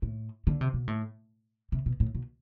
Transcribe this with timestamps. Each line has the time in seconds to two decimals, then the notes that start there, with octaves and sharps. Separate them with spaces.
0.02 A2
0.47 D3
0.61 C3
0.74 B2
0.88 A2
1.72 C3
1.86 B2
2.00 A2
2.15 B2